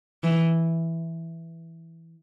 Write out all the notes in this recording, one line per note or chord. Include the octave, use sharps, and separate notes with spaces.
E3